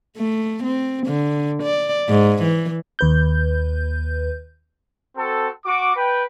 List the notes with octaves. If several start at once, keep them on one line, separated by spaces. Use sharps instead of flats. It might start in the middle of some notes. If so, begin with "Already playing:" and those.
A3
C4
D3
D5
G#2
E3
D#2 B4 G6
C4 F#4 A4
F#4 D6
B4 G5